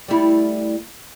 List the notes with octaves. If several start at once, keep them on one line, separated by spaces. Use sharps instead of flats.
G3 A3 E4